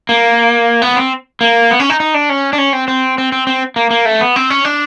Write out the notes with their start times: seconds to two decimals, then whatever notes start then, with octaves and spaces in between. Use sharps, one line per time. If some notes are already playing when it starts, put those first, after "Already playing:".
0.09 A#3
0.82 B3
0.96 C4
1.41 A#3
1.71 B3
1.80 C#4
1.90 D#4
2.00 D#4
2.14 D4
2.30 C#4
2.53 D4
2.58 C#4
2.73 C4
2.88 C4
3.18 C4
3.32 C4
3.47 C4
3.76 A#3
3.91 A#3
4.05 A3
4.21 B3
4.36 C4
4.50 C#4
4.65 D4